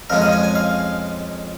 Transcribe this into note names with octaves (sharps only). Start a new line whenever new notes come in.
F2 F3 G#3 C#4 A#4
D#5
G#5
G#5
F5